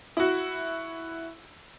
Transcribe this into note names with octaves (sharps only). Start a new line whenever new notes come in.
E4 F#4